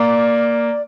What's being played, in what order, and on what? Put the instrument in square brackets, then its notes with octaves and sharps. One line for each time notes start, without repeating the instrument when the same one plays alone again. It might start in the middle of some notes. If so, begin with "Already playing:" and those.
Already playing: [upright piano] A#3 [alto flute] D5